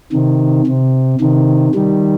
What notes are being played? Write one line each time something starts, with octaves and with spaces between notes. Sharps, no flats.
C3 D#3
C3
C3 D#3
D#3 G3